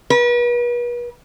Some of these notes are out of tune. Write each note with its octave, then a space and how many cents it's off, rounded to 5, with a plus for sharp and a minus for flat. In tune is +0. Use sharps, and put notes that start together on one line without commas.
B4 -40